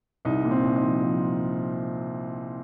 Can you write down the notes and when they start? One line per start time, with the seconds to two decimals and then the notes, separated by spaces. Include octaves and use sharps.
0.25 C2 D#4
0.44 A#2
0.51 C4
0.64 C2
0.76 D#4
0.83 F3
1.02 F3